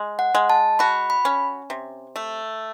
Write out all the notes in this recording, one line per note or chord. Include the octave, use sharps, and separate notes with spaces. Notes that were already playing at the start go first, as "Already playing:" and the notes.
Already playing: G#3
F#5
G#3
A5
F#4 B5
B5
C#4
C3
A3